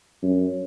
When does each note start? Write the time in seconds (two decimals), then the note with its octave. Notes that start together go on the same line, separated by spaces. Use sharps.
0.22 F#2